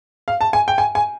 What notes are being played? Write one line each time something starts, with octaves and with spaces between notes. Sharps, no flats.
F5
A5
G#5
G5
G#5
G#5